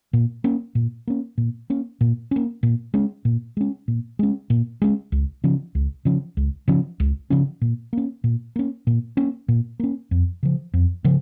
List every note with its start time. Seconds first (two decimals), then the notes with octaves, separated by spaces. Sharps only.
0.13 A#2
0.44 A#3 C#4
0.75 A#2
1.07 A#3 C#4
1.38 A#2
1.70 A#3 C#4
2.01 A#2
2.31 A#3 C#4
2.63 A#2
2.94 G#3 C#4
3.25 A#2
3.57 G#3 C#4
3.88 A#2
4.19 G#3 C#4
4.50 A#2
4.82 G#3 C#4
5.12 C#2
5.44 C#3 F3 C#4
5.75 C#2
6.05 C#3 F3 C#4
6.37 C#2
6.68 C#3 F3 C#4
7.00 C#2
7.30 C#3 F3 C#4
7.61 A#2
7.93 A#3 C#4
8.24 A#2
8.56 A#3 C#4
8.87 A#2
9.17 A#3 C#4
9.48 A#2
9.79 A#3 C#4
10.11 F2
10.43 C#3 F3
10.74 F2
11.04 C#3 F3